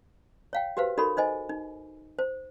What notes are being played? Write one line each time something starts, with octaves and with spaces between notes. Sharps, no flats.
C#5 F5 G5
F#4 G4 B4 C5 F5
D#4 F#4 A4 A#4 C#5 B5
D#4 C5 D#5 G#5
D#4
C5